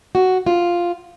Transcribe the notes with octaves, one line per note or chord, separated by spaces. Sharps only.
F#4
F4